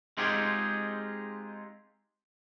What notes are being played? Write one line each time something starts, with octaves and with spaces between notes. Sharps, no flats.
G#3 C4 D#4 F4 G4 G#4